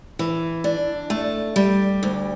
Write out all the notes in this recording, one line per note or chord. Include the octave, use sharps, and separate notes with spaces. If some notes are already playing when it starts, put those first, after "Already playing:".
E3
D4
A3
G3
D2